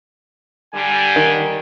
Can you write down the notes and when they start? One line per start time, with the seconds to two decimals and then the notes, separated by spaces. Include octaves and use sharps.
0.75 D3 G3 G#5
1.16 D#3